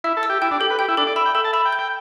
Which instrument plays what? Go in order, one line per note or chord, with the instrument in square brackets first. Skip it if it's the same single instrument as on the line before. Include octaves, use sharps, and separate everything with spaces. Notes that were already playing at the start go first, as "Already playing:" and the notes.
[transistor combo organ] E4 [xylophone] E5
[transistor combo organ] A4
[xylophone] E6
[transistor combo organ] G4
[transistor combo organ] E4 [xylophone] G5
[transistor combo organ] D4
[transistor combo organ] G4 [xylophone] A4
[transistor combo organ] B4
[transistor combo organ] G4 [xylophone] G5
[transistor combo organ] E4
[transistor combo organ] D4 [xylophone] A4
[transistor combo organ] D5
[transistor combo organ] E5 [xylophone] B5
[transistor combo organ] G5
[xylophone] A4 [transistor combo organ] E5
[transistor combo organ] A5
[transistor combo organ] E5 [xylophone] B5
[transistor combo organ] G5
[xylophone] G6
[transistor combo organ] G5